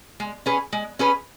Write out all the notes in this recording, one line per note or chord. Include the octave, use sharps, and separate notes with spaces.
G#3
C#4 G#4 B4
G#3
C#4 G#4 B4